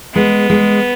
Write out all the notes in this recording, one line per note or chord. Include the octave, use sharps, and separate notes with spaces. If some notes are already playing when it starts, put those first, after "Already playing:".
G#3 B3
G#3